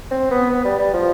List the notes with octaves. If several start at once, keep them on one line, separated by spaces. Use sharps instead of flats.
C4
B3
B3
G3
G3
F3